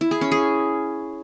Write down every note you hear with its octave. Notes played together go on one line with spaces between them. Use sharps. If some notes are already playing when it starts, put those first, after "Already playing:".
E4
G#4
C#4
G#4